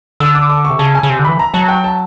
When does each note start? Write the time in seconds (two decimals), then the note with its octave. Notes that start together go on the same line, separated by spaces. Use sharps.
0.20 D3 E6
0.35 D6
0.50 D6
0.65 C#6
0.70 C3
0.79 C#3 A5
0.95 G#5
1.03 C#3
1.10 C3
1.19 D3
1.25 E3 B5
1.39 A#5
1.54 F#3 A5
1.68 G5
1.84 A5